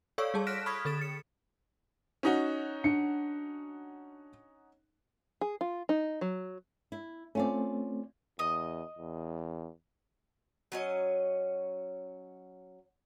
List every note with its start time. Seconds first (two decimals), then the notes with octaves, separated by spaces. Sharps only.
0.18 A4 C#5 D5 F5 C#6 E6
0.34 G3 G#4 A5
0.47 F6 F#6 A#6 B6 D7 E7
0.66 B5 C#6 D#6 F6 G#6 B6
0.85 D3 A4 A6 E7
1.01 C#7
2.23 C#4 D#4 F#4
2.84 D4 C#7
5.41 G#4
5.61 F4
5.89 D#4
6.21 F#3
6.92 E4
7.35 A3 C4 C#4 F4 D5
8.39 E2 D#5 D#6
8.98 E2
10.72 F#3 C#4 D#5